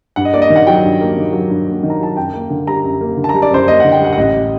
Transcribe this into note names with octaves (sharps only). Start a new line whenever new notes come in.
G2 F#5
D#5
A#3 D5
D#5
D#3
F#5
F#3 G5
G2
A#3
D#3
F#3
G2
A#3
D#3
A#5
F#3 A5
F#2 G5
A#3
D3
G3 A#5
F#2
A#3
D3
A5
G3 A#5
D5
F#2 C5
A#3 D#5
D3 F#5
G5
G3 F#5
F#5
A1 D#5